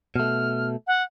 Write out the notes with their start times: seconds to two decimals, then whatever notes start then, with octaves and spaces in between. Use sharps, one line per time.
0.16 B2 A3 F6
0.87 F#5